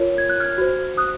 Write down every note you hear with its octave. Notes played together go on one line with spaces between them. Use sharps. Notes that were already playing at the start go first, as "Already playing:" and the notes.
Already playing: F4 A#4 C#5
G#6
F#6
F6 G#6
F#4 C5
D#6 F#6